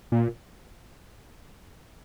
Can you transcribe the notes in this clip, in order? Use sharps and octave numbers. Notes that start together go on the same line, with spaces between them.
A#2